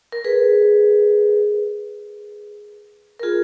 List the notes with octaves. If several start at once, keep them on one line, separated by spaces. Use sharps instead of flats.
A#4
G#4 B4
A#4
F4 G#4